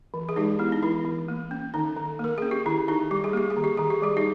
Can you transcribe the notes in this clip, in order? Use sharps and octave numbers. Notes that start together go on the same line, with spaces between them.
E3
G#4
G#3 D#4 G4
B3 E4
D#4
E3 E4
E3
A#3
C#4
D#3 D#4
D#3
A#3 A#4
C#4 G#4
G4
D#3 E4
D#3 D#4 G4
G3 G4
G#4
A#3 G4
G#4
D#3
G4
D#3 G#4
G4
G3 G#4
D#4 G4